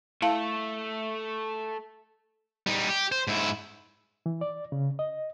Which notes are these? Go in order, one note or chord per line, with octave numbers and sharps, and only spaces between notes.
A3 E4 F5 A5
G3 D#4
G4
C5
G#2 E4
E3
D5
C#3
D#5